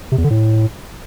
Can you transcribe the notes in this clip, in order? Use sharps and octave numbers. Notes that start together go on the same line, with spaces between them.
C3
E2
D3
A2